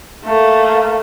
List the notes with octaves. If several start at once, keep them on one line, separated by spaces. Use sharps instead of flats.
A3 A#3